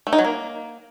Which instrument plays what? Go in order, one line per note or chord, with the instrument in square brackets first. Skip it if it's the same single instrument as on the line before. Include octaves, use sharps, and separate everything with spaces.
[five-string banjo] A3
D#4
F#3
A#3